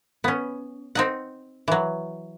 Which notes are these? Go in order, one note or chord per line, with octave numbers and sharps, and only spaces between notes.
B3 C#4
C4 D#4 F#5
E3 F#3